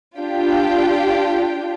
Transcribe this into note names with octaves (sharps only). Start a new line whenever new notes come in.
D4 F4 G4 G5